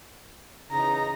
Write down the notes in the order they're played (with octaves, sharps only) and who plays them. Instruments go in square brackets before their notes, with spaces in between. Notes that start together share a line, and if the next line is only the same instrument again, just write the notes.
[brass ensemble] C#3 E3 D#4 [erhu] A#5